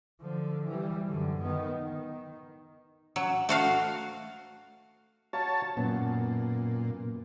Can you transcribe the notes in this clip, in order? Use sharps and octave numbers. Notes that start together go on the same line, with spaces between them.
D3 F3
E3 G3
F#2 D3
D#3 B3
D#3
F#3
A3 F#4 F5
F#4 C#5 F5 A5 A#5
F#2 A#2 B3